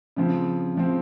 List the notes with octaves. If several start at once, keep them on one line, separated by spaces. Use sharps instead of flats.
C#3 F3 C4
C#3 F3 C4